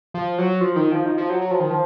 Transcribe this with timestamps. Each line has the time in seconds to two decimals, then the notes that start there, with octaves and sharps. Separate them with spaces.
0.14 F3
0.38 F#3
0.61 F3
0.76 D#3
0.92 F3
1.06 D#3
1.18 F3
1.30 F#3
1.41 F#3
1.51 F3
1.60 D#3
1.70 F3